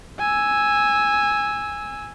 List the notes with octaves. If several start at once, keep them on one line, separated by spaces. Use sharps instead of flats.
G#5 E6